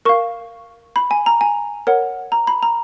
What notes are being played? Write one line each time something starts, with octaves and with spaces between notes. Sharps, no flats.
A#4 F5 C#6
B5
G#5
A#5
G#5
A#4 C#5 F#5
A#5
B5
A#5